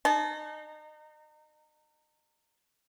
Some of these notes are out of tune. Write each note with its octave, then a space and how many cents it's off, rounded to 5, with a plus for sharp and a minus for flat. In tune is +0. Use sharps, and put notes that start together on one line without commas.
D#4 -30 A5 -35